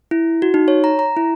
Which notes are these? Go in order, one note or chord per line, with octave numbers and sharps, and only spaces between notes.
E4
F#4
D#4
C#5
A#5
A#5
E4